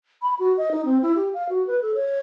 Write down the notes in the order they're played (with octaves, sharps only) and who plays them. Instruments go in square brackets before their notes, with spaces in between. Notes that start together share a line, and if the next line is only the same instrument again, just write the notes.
[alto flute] B5
F#4
D#5
D#4
C4
E4
G4
F5
F#4
B4
A4
C#5